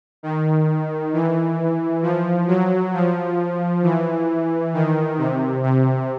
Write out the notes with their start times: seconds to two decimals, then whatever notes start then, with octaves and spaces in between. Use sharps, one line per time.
0.23 D#3
1.13 E3
2.02 F3
2.48 F#3
2.94 F3
3.83 E3
4.74 D#3
5.18 C3
5.63 C3